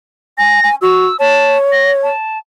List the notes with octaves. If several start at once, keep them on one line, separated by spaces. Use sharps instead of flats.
G#5 A#6
G#5
F#4 E6
C#5 A5
A#6
A5